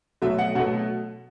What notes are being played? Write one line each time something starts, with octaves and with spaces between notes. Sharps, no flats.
B2 F#3 A3 E5
F#5
B2 F#3 A3 F#5